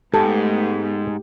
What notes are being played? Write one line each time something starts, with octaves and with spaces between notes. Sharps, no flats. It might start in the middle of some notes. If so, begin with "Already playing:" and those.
G#2 A3 B3 G4 A4